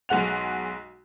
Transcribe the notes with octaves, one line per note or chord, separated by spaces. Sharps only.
B1 G#3 F#5 F7